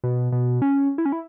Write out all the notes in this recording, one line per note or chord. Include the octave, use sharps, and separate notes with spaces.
B2
B2
C#4
E4
C#4
E4